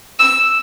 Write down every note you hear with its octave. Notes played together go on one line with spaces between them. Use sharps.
E6